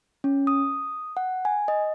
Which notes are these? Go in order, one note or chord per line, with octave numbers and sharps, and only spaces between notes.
C#4
D#6
F#5
G#5
D#5